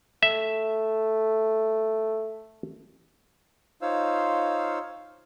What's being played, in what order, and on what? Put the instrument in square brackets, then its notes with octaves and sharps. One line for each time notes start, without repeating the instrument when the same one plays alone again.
[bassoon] A3 [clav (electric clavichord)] E5
[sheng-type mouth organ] D#4 F4 C5 C#5 F5 E6